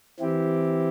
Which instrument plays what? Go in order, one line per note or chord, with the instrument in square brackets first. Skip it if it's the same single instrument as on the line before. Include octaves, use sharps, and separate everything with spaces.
[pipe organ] E3 C4 E4 G4